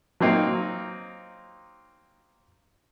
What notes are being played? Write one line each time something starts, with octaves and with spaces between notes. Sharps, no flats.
F#3 A#3 C4 D#4 F4